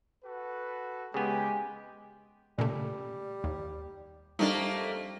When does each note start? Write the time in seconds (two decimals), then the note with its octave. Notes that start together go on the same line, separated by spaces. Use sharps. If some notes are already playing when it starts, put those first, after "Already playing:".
0.24 F#4 A4 B4
1.14 C#3 G#3 B3 G4 G#5
2.59 A#2 C#3 G3 A3
3.44 D#2
4.39 F2 G3 A3 A#3 D4 D#4